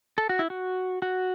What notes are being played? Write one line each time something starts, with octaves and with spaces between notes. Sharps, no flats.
A4
F#4
E4
F#4
F#4